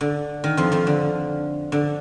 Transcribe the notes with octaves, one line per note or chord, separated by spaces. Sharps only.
D3
D#3
F2 F3
F2 F3
D3
D3